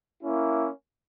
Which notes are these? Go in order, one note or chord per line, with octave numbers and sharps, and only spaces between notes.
A#3 C#4 E4